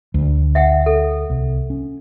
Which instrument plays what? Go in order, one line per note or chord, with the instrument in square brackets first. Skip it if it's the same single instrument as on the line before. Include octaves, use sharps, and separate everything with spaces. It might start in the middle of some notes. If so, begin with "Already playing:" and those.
[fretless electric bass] D2
[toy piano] E5 F#5 G5
A4
[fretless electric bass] C2
C#4